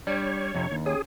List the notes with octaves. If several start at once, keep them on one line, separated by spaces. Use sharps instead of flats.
G3 D4 C#5
F2 C3
D#2
C#4 G4 G#4 C#5